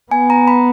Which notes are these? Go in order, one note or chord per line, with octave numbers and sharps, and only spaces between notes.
B3 G#5
A#5
B5